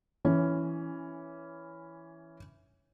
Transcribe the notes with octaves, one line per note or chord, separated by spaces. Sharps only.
E3 C#4